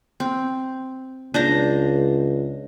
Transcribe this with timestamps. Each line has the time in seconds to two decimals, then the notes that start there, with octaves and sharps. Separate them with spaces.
0.20 C4
1.34 C#2 D4 C5 A#5